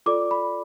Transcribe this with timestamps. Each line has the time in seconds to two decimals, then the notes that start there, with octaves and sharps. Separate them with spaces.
0.06 F4 A4 D5 D6
0.31 B5